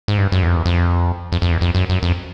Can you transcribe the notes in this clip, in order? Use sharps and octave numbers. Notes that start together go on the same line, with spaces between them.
G#2
G2
F#2
E2
F2
E2
F2
F2
F2
E2
F2
F#2
F#2
F2